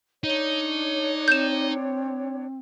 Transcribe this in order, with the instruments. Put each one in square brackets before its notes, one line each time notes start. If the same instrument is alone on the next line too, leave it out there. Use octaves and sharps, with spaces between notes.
[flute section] D4 C#5 [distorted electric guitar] D#4
[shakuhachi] C4 [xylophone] G6 E7